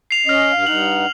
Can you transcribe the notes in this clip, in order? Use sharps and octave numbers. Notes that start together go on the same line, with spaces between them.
C7 F7
C#4 D#5 F6 C7
G2 F5
G2 D#4 F#5 F#7